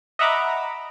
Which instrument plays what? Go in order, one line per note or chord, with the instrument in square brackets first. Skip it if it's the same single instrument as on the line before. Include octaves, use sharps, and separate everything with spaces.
[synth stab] D#5 E5 F#5 A#5 B5 D6